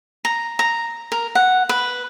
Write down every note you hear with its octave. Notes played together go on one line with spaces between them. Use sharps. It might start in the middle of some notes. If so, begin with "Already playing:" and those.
A#5
A#5
A#4
F#5
B4